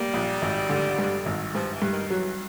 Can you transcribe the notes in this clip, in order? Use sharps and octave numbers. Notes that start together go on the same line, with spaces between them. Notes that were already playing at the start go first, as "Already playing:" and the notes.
Already playing: G3 A#3
A#1
G#1
D3
G2
G#1
G2 F3
E3
G2
D#3
E3 F#3